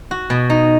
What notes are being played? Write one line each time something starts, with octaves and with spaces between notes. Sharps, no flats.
F#4
B2
D#4